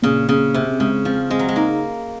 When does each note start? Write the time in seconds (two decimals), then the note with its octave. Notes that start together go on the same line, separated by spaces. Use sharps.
0.02 A#2 C#3
0.29 A#2 C#3
0.54 C3 C4
0.80 C#3 G#3
1.05 F3 C4
1.30 G#3 C4
1.39 F#3
1.49 G#3
1.56 A#3 D#4